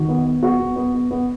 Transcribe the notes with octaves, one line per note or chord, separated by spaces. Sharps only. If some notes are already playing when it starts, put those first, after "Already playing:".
Already playing: D#3 F#4
B3
B3
B3 F#4
B3
B3
B3
B3